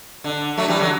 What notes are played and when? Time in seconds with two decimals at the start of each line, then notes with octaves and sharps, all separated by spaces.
0.24 D3
0.57 F#3 A3
0.68 E3 G3
0.79 D3 F#3